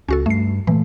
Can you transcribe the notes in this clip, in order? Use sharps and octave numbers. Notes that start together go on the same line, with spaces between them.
C#2 C#4 F#4 A4
G2 A3 C7
A#2 E3 F#3 A3